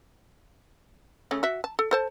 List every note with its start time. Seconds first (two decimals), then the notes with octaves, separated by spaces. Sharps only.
1.31 C#3 A3 C#4
1.43 F#4 E5
1.64 A5
1.79 A4
1.91 A4 C5 A5